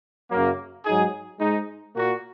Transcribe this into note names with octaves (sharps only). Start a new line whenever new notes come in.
F#2 C#3 F#3 A#3
G#2 F#3 D#4 G#4
G#2 G#3 D#4
A#2 A#3 F#4